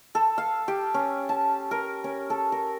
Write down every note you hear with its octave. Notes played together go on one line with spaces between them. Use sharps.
A4
F5
G4
C#4
A5
A#4
C#4
A4
A#4